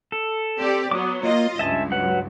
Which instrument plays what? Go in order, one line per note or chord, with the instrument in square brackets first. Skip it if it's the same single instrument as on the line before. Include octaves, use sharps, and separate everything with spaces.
[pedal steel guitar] A4
[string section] C4 G4 D5
[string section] F#3 B3 [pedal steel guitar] D6 D#6
[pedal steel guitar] A#3 [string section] F4 D#5
[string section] C#2 G2 [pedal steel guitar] E5 G#5 A5
[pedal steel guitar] F#3 B4 F#5